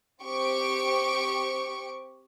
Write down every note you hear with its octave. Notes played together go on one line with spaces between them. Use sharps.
C4 G4 C#6 D7